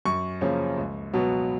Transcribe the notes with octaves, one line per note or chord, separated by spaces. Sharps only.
F#2 C#6
C#3 F3 A#3 C#4
C#2
B2 F#3 B3